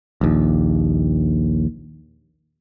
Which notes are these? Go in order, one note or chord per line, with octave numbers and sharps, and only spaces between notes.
A#1 D#2